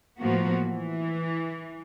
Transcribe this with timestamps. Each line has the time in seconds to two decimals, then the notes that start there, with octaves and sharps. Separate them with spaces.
0.18 A2 F3 A#3 B3 F#4
0.62 E3